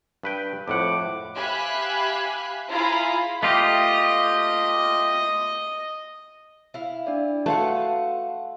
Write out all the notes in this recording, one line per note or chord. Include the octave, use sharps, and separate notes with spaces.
G2 B4 G5
F2 A2 F#5 D6
G4 E5 F5 G#5 B5 F#6
E4 F4 G#4 F5 A#5 B5
A3 F4 G4 D#5
E4 F5
D4 D5
A3 F#4 B4 F5 F#5 C6